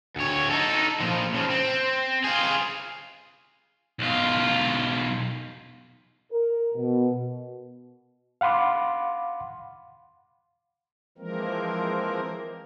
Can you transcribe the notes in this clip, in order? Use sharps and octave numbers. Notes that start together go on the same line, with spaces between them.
D2 C#5
D#4 A4
A#2 F3
C#3 F3
C4
F4 G#4
B1 F4
A#4
B2
F5 F#5 B5 C6 D6
E3 F3 G#3 A#3 C4 A#4